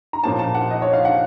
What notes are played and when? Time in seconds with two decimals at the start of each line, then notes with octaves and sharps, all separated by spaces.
0.13 A#5
0.24 A#2 F3 A#3 C#4 A5
0.39 A5
0.54 F#5
0.71 D#5
0.82 C#5
0.93 F5
1.05 F#5